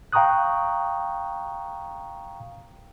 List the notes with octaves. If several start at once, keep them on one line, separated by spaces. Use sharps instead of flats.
F5 G5 A#5 C#6 D#6 F#6